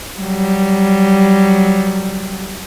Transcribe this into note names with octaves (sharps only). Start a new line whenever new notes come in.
F#3 G3